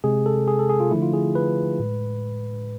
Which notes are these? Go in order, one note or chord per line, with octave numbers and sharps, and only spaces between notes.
C3 G#3 G#4
A4
G#4
A4
G#4
F4
D3 F3 A3 E4
F4
G#4
B4
A2 G#3